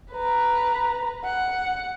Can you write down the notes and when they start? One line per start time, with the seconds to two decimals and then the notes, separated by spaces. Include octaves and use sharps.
0.14 B4 A#5
1.24 F#5